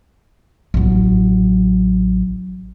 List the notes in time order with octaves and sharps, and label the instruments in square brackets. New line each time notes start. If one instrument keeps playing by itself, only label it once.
[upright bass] A1 F#3